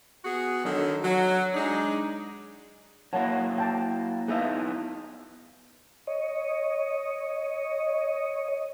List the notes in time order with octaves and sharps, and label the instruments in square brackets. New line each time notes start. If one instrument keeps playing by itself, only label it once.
[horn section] B3 F#4 G#4
D3 D#3 F#3
F#3
G#3 D4 D#4
[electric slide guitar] F#3 A#3 E4 [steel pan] C#5 F#5 A5
[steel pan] G5 A5
[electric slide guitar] B3 D#4 E4 [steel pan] G#4 E5 F5
[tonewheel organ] C#5 D#5